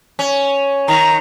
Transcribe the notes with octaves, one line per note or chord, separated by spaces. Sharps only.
C#4
D#3 A#5